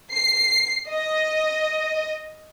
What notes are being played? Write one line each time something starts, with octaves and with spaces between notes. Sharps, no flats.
C7
D#5